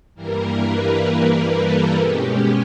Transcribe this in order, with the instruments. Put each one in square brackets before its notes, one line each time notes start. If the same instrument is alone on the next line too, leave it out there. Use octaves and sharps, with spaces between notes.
[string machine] G2 E3 G3 A#3 A#4
B4
B4
A4
B2 G#3 C#4 G4